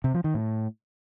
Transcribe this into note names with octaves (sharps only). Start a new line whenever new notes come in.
C3
F3
D#3
A2